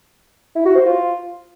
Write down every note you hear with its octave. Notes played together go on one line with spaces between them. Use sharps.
E4
F#4
C5
F4